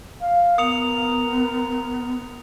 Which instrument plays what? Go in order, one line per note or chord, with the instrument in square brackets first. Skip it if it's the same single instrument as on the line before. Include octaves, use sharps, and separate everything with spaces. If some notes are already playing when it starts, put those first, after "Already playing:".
[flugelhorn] F5
[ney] B3 [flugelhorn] A#4 [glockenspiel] D#6 C#7 F7